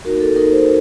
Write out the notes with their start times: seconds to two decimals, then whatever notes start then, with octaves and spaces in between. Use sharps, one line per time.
0.05 A#3 D#4 F#4 A#4
0.20 A4
0.36 A#3 D#4 F#4 A#4
0.52 C5